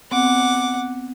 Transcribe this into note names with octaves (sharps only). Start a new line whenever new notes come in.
B3 C4 F#5 D6